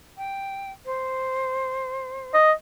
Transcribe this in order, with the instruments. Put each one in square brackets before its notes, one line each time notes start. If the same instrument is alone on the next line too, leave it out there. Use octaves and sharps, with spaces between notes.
[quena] G5
C5
[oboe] D#5